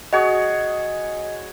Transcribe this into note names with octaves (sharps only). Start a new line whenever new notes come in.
F#4 G#4 C#5 D#5